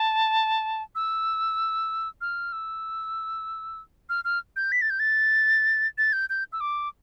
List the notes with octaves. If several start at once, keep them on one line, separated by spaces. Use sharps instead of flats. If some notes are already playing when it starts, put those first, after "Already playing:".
Already playing: A5
E6
F6
E6
F6
F6
G6
B6
A6
G6
A6
A6
G6
G6
E6
D6